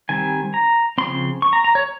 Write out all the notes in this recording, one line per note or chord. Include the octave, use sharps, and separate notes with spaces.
D#3 G3 C4 G#5
A#5
C#3 F3 C4 C6
C#6
A#5
A#5
C#5